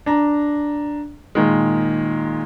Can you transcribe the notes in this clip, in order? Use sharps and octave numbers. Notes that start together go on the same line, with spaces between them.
D4 A#5
A#2 D#3 G#3